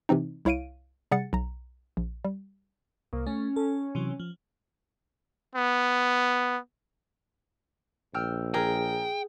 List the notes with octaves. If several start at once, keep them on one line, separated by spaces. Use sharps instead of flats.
C3 E3 C4 D#4
C2 E4 C#5 F5 D7 D#7
C3 G3 G#4 F#5 A6 C#7
B1 A#5
A#1
G3
C2 A#3
A3 C#4
A4
C3 E3 F#3
F3
B3
A#1 G5 E6 F6
G#4 A#4 G5